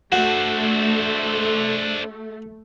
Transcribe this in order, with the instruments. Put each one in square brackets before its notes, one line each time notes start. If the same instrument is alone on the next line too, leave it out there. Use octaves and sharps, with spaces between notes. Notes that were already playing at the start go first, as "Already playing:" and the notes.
[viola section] A3 [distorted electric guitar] D4 C5 [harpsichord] F#4